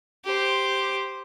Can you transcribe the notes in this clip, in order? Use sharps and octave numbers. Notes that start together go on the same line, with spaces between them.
G4 C5